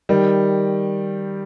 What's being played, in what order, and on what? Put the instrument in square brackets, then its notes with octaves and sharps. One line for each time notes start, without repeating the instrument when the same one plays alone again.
[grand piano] D#3 G3